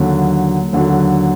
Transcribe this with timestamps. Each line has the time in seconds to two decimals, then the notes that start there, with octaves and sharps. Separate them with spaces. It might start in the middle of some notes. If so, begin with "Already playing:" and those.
Already playing: D#2 D3 F#3
0.73 D#2 D3 F#3